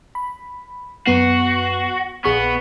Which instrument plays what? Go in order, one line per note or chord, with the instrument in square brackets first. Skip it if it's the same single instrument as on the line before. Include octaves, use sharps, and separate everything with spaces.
[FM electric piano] B5
[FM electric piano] F#2 B3 C7 [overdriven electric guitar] F#4
[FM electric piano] A#1 G#4 C#6 [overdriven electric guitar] B3